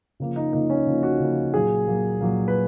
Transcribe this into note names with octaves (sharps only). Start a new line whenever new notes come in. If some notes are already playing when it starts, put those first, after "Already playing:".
C#3 F3 A#3
D#4
C#3 F3 A#3 D#4
C#4
C#3 F3 A#3
F#4
C#3 F3 A#3
A#2 F#3 A#3 G#4
A#2 F#3 A#3
A#2 F#3 A#3
B4